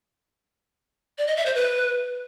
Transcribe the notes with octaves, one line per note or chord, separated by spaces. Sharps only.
D5
D#5
E5
C5
B4